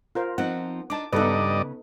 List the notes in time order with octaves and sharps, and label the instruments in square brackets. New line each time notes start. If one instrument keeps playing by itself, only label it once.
[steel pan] F4 A#4 C5
[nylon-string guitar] F3 C4 D#4 [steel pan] F#5
[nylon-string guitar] D4 D#4 [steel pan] A5 D6
[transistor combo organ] G2 D5 D#5 [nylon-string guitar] C#3 B3 [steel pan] D#4 A4 B4